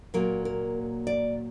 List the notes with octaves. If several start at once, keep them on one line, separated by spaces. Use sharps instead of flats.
A#2 F#3 A#3 A#4
A#4
D5